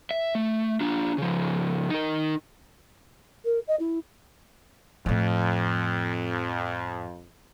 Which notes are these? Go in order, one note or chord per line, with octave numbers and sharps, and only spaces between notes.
E5
A3
D4 F4
C#3 F3
D#4 A#4
A#4
D#5
E4
F2 A2 F3